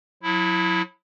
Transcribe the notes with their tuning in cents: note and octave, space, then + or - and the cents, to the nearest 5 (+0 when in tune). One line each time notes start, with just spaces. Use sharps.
F#3 -35 E4 +0